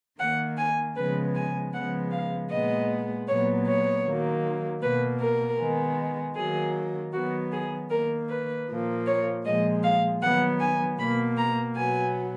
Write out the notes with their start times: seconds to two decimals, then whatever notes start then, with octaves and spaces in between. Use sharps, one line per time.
0.19 D#3 A#3 F#5
0.57 G#5
0.95 C#3 F3 G#3 B3 B4
1.35 G#5
1.73 C#3 F3 G#3 B3 F#5
2.11 F5
2.50 A#2 G#3 B3 D#5
3.27 A#2 F#3 B3 C#5
3.66 C#5
4.05 D#3 F#3 A#3
4.81 B2 A#3 B4
5.21 A#4
5.59 D#3 G#3 B3
6.36 D#3 F#3 A#3 G#4
7.13 D#3 F#3 B3 F#4
7.52 G#4
7.90 D#3 A#3 A#4
8.29 B4
8.68 A#2 F3 A#3
9.07 C#5
9.45 A#2 F3 G#3 D#5
9.83 F5
10.22 D#3 F#3 B3 F#5
10.60 G#5
10.99 B2 A#3 B5
11.37 A#5
11.76 B2 F#3 B3 G#5